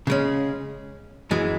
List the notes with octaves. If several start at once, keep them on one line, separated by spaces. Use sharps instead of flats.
C#3 G#3 C#4
F#2 E3 G#3